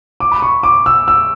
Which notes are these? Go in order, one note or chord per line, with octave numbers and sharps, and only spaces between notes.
D6
B5
C#6
D6
E6
E6